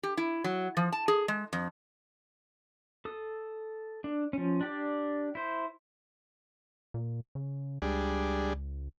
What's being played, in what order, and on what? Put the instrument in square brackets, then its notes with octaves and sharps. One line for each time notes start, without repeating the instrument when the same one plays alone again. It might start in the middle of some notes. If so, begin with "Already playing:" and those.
[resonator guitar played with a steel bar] G4
E4
F#3
F3
A5
G#4
G#3
F2
[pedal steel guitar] A4 D#6
D4
F3 C#4
D4 G4 D5
E4 C5
[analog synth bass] A#2
C#3
[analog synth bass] C#2 [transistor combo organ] G3 D4 G#4